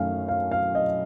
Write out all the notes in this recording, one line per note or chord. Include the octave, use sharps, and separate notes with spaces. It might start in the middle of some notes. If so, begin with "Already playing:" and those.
Already playing: F#2 D#3 A3 C#4 F5
F5
F5
D#5